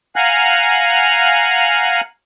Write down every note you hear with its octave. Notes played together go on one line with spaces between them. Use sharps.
F5 F#5 G#5 A#5 F6 F#6